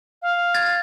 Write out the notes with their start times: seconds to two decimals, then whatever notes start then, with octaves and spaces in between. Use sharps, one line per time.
0.22 F5
0.54 G#6 A6